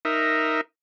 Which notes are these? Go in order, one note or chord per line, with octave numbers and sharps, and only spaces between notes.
D#4 A#4 E5